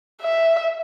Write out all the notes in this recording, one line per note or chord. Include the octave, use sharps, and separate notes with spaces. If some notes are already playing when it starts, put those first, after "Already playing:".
E5